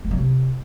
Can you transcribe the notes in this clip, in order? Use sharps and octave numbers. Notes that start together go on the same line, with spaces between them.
A#3
F#3
C3